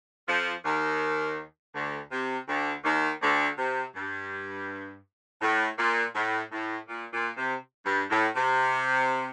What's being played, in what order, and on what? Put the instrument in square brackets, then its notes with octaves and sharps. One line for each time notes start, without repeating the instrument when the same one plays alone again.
[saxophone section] F2 F3
D#2 D#3
D2 D3
C3
D2 D3
D#2 D#3
D2 D3
C3
G2
A2
A#2
A2
A2
A#2
A#2
C3
G2
A2
C3